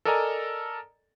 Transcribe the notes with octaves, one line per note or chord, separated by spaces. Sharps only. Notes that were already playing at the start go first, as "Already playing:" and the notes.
A4 A#4 D5 D#5 G#5 A#5